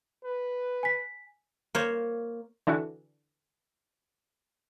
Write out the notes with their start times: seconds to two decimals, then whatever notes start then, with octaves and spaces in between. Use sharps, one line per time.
0.24 B4
0.83 G#5 B6
1.75 A#3 C5 C#5
2.67 D3 E3 D4 E4 F#4